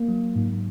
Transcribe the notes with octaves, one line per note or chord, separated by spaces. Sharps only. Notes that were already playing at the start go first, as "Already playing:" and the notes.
Already playing: A#3
F#3
G#2